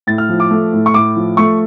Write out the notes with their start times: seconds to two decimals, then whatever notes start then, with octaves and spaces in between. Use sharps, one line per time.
0.07 A2 A6
0.18 F6
0.29 F3
0.40 D6
0.51 A3
0.73 A2
0.86 C#6
0.94 A2 D6
1.16 F3
1.37 A3 C#6